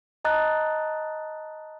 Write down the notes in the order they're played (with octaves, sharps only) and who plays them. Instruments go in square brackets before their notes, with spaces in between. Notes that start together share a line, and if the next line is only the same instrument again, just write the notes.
[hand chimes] D#5 A5 A#5 D#6 F#6 A6